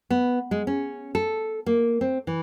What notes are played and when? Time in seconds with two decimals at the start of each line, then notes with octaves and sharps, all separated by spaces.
0.10 B3
0.51 G#3
0.67 C#4
1.15 A4
1.66 A#3
2.01 C4
2.27 E3